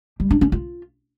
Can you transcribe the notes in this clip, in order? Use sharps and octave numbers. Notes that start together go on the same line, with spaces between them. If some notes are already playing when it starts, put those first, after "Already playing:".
G3
D4
C#4
F4